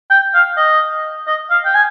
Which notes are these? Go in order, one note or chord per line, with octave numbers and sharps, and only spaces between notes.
G5
F5
D#5
D#5
F5
G5
G#5